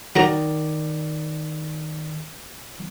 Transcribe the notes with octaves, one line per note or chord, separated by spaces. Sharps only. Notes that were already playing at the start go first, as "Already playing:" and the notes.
D#3 F#3 A#4 D5 A#5